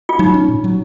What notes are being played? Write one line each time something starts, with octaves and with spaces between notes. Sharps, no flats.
F4
F#3 D#4
C#4
A#2
F#3